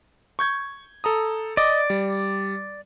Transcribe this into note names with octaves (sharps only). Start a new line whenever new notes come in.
C#6 G6 G#6
A4 A#5 D#6
D5 D#5 D6
G3